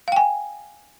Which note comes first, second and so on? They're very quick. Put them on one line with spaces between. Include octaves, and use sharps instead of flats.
F5 G5 G#5